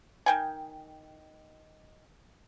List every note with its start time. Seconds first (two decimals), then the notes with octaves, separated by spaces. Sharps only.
0.26 D#3 G5 G#5